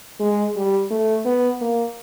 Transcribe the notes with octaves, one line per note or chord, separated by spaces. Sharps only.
G#3
G3
A3
B3
A#3